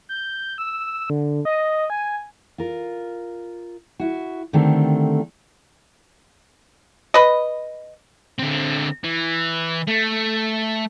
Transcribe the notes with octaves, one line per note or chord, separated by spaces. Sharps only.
G6
E6
D3
D#5
G#5
F4 A#4
E4 F#4
D3 D#3 A3 C4 G4
B4 D#5
D3 C4
E3
A3